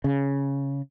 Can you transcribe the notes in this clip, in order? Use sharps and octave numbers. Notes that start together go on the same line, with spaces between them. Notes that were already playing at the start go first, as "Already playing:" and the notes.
C#3